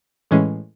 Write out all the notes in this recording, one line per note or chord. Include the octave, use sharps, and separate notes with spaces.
A2 E3 G#3 C#4